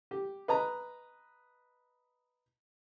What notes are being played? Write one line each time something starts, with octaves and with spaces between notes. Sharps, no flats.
G4
B4 D#5 A#5